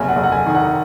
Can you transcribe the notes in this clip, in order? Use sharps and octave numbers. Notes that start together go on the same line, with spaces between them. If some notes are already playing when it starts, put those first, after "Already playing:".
Already playing: F#1 C3 G#5
F#5
F#1
F#5
G#5
D#3
F#5